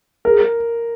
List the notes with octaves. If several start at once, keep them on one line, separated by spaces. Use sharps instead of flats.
G#4 A#4